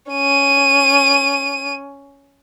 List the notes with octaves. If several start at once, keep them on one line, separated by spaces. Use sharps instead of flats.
C#4 D#7